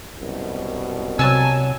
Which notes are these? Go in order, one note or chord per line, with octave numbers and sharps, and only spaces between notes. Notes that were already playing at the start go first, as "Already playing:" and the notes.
C2 F#2 B2
C3 F#3 G#5 A5 E6